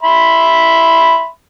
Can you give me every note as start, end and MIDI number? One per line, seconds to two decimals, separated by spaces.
0.02 1.27 76
0.02 1.27 83
0.02 1.27 84